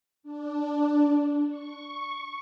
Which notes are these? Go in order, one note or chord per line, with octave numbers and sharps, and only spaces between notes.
D4
C#6